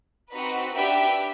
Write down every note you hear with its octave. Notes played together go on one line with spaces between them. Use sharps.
C4 D#4 F#4 B4
D4 G4 B4 E5 G5